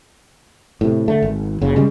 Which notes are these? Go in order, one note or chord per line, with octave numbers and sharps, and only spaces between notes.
A2 C3
D3 A3
G#1
F#1 C#3
C#3 G3 G#3